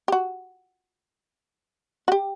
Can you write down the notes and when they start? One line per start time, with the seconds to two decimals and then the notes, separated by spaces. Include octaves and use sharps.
0.08 G4
0.12 F#4
2.08 F#4
2.12 G4